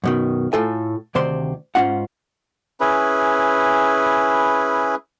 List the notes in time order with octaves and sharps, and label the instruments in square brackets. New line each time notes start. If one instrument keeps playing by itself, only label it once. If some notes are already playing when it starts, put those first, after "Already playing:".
[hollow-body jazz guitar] F#2 B2 D#3
A2 F4 A4 G#5
D2 C3 D#3 C5 D5 C6
G#2 D#3 C#4 F4 F#5
[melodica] C#4 E4 G#4 B4